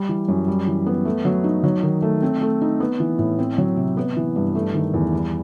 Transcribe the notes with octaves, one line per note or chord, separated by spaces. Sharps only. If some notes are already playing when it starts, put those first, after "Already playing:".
Already playing: G3
E3
F#2
G3
E3
B3
A3
F#3
D#4
F#3
D#3
A3
C4
A3
D#4
B3
E3
A2
C4
F#3
C3
B3
E3
G2
A3
D#3
E2
G3